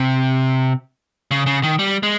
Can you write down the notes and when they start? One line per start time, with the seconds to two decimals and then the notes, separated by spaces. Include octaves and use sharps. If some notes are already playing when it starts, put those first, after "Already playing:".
Already playing: C3
1.31 C#3
1.46 C#3
1.63 D#3
1.79 G3
2.03 G#3